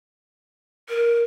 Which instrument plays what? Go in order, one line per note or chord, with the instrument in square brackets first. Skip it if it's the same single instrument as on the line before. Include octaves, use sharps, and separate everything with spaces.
[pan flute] A#4